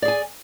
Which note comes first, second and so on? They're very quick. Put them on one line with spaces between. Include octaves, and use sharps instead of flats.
D5 G#4 G#5